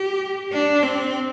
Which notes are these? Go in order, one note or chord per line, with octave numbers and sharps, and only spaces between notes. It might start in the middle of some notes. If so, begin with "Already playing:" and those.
Already playing: G4
D4
C4